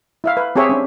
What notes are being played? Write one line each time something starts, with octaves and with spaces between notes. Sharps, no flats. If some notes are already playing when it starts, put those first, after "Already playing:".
E4 E5 F5
B4
C4 G4 G#4 C#5 E5
C#4 D4